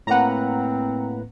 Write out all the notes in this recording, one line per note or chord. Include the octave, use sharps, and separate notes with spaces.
A2 A#3 C4 B4 F#5 A#5